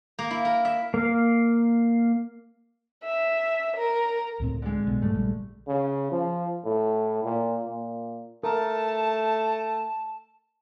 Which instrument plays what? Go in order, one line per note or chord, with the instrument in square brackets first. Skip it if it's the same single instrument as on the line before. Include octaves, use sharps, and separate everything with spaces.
[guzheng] A#3
E4
A#4
E5
[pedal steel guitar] A#3 F5
[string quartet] E5
A#4
[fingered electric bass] C#2 A2 C4
[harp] D3 G#3
[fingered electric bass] B1 B2
[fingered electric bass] D1 G#2 G3 [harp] A3
[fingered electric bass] A#1 G3
[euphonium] C#3
F3
A2
A#2
A#2
[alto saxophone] A3 [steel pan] A#4 [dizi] A5